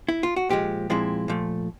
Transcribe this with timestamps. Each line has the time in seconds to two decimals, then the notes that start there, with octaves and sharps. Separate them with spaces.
0.09 E4
0.23 F4
0.36 F#4
0.49 A#2 F3 G#3 G4
0.90 A#2 F3 G#3 C4 E4
1.28 A#2 F3 A3